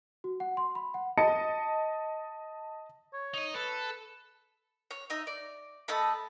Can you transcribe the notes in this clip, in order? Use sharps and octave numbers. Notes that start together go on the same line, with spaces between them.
F#4
F#5
C6
B5
F#5
D#5 A5 C#7
C#5
D#4 D#5
A4 B4
C#5
D#4 D#5 E5
D5
A3 D#5 A5 B5